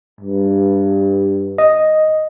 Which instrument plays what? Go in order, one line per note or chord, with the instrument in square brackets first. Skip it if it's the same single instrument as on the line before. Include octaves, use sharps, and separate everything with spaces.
[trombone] G2
[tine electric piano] D#5